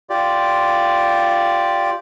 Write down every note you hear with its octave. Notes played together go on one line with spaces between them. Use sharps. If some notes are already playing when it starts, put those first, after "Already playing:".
F4 G4 D5